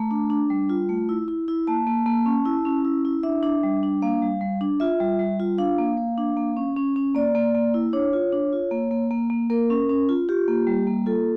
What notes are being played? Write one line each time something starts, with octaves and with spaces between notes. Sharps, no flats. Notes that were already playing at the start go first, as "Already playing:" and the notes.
Already playing: A3 A#5
D4
D4
G3
F4
A3
E4
E4
E4
A#3 A5
A#3
A#3
C#4
E4
C#4
E4
E4
D4 E5
D4
G3
D4
A#3 F5
G3
G3
D4
F4 E5
G3
G3
F4
D4 F5
A#3
A#3
D4
A#3
C#4
C#4
C#4
A#3 D5
A#3
A#3
E4
D4 C#5
F4
D4
F4
A#3
A#3
A#3
A#3
A#3 A#4
C#4
C#4
F4
F4 G4
A#3
G3
A#3
F4 A4